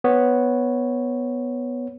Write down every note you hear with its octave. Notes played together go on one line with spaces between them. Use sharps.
B3 C#5